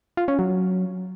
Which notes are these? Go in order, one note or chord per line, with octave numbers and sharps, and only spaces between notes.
F4
C#4
F#3